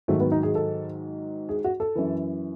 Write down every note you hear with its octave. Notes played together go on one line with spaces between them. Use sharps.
G#2 D#3 F#3 A3
B3
D#4
G#4
A4
G#4
F#4
A4
F#2 E3